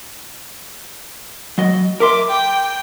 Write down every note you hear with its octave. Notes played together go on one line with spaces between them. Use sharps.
F#3 D#5
A#4 E5 C6 D6
G5